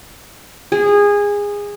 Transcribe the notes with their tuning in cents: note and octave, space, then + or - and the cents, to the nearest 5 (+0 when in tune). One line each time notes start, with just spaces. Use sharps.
G#4 -20